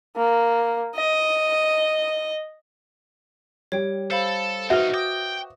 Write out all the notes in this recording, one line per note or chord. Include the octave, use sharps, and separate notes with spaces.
A#3
D#5
G3 C#5 G5
A4 C5 F5 B5
C2 D#4 F#4 B4 E5
G5 D6 D#6 A#6